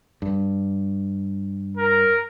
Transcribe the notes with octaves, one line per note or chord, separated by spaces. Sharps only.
G2
A#4